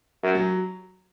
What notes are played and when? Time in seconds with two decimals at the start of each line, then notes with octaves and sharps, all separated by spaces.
0.23 F#2
0.35 F#3